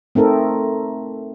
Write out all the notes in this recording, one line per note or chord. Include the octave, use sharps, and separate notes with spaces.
A3 C4 D#4 A4 A#4